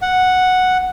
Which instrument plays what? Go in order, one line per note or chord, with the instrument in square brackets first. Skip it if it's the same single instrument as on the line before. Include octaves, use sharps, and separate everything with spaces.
[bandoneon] F#5